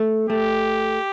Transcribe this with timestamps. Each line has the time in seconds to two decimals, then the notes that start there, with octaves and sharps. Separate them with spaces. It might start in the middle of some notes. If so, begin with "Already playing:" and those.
Already playing: A3
0.29 A3 G4